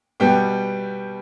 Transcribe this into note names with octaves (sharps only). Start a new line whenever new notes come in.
B2 G3 B3 G5